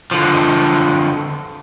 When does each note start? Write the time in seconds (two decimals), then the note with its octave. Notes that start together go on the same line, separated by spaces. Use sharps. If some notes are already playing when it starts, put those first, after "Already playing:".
0.11 D3 F3